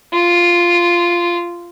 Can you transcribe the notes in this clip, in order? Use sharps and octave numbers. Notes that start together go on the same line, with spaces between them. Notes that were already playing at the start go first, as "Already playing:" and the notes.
F4